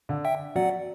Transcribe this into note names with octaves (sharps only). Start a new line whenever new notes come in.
D3
E5 G5
F#3 D5 F#5